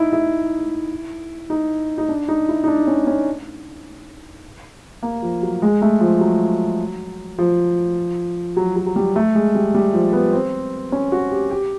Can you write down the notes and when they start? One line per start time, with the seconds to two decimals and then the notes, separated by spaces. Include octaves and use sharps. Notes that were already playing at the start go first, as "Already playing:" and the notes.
Already playing: D#4 E4
0.13 E4
1.50 D#4
1.98 D#4
2.09 D4
2.28 D#4
2.49 E4
2.64 D#4
2.68 D4
2.87 C#4
3.07 C#4
5.03 A#3
5.22 F3
5.43 F#3
5.62 G#3
5.82 A3
6.01 F3
6.21 F#3
7.38 F3
8.57 F#3
8.76 F#3
8.86 F#3
8.96 G3
9.16 A3
9.35 G#3
9.55 G3
9.74 G3
9.93 F3
10.13 B3
10.33 C4
10.92 C#4
11.12 F#4
11.31 G4
11.50 G4